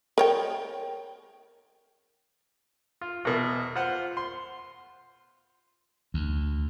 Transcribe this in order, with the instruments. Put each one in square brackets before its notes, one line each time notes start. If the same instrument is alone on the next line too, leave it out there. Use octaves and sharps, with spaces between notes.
[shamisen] A#4 C#5 G5
[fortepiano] F4
E2 B2
F4 C5 F#5
C6
[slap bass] D2